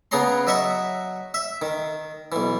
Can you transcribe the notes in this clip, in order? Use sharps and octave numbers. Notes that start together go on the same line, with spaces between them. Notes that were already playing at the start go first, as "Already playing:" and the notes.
C#3 B3 G#4 C#5 A#5 C6
F#3 D#5 E5 C#6
E5
D#3
B1 E3